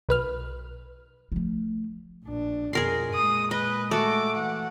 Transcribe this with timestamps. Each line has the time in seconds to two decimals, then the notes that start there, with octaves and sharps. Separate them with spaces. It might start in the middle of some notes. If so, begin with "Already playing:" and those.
0.09 B1 B4 F6
1.32 F3 A3
2.24 A#1 D4
2.73 F2 B2 G#4 A#4 C6
3.15 A#2 G#3 D#6
3.51 B4 D#5
3.91 A3 F#4 D6
4.36 E3 F#5